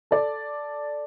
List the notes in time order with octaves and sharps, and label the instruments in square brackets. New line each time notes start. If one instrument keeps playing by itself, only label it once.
[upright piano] A4 D5